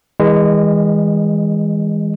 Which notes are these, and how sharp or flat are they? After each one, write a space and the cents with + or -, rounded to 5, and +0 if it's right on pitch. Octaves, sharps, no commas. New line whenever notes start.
E3 -40 G#3 -30 D#5 +0